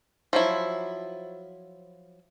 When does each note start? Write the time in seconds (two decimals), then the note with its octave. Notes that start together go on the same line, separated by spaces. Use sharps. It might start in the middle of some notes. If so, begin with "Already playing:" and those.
0.33 F3 F#3 E4